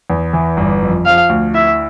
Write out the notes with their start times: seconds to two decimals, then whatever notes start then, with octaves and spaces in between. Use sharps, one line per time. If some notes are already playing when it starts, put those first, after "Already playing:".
0.10 E2
0.33 E3
0.57 G1
0.82 F2
1.05 F3 F5
1.29 D2
1.54 E4 E5